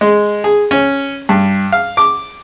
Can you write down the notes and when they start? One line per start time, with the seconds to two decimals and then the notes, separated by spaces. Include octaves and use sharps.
0.01 G#3
0.44 G#4
0.71 C#4
1.29 G2
1.72 F5
1.97 D6